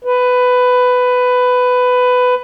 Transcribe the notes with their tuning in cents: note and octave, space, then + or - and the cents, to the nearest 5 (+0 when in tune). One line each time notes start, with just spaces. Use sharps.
B4 +15